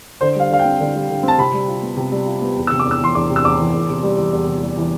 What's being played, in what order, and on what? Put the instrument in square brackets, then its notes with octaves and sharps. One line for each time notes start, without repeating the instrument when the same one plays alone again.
[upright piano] D3 [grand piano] C5
[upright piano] G3 [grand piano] F5
[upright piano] D3 [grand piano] F5
[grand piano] G5
[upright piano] C4
D3
G3
D3
C4
[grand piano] A5
[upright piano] C3 [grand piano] B5
[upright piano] G3
F4
B3
C3
G3
F4
B3
E2
[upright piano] C3 [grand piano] E6
[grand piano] D6
[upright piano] E2
[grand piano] E6
[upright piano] E3 [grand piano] C6
[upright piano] E2 [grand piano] D6
[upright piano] C3
[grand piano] E6
[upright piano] E2 [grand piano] D6
[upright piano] E3
E2
C3
G3
E3
E2
C3
G3
E3